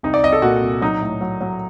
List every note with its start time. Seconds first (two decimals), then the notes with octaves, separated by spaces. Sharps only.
0.03 C2 D#4
0.14 D5
0.23 C2 D#5
0.32 A4
0.42 A#2 F#4
0.62 C2
0.81 F#3 D#4
1.01 A2
1.21 F#3
1.41 F#3